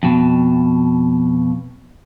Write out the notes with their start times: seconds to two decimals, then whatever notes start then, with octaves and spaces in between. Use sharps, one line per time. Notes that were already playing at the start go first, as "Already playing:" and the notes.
0.03 F2 B2